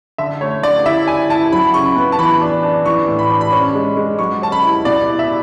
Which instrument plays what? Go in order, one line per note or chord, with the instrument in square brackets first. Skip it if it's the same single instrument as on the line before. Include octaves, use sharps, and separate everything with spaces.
[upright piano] D3 [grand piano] E5
[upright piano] A3 [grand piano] C#5
[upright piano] D3 [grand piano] D5
[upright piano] E4 [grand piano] E5
[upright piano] E4 [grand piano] G#5
[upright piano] E4 [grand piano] A5
[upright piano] F#3 [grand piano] B5
[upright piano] C#3 [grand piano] C#6
[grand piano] B5
[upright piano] B3
[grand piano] A5
[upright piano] E3 [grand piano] B5
[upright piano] D4
D4
[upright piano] E3 [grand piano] C#6
[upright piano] A2
[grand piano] B5
[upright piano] D4
[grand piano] B5
[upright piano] C#4 [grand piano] C#6
[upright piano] G#3
G#3
[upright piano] F#3 [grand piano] C#6
[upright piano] C#4 [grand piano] A5
[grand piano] B5
[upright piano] E4
[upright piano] B2 [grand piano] D5
[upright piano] E4
[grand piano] E5